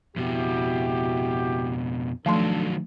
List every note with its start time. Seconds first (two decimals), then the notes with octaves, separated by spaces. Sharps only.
0.16 F2 B2 E4 F#4 G4
2.26 D#3 F3 F#3 A3 D4 A4 C6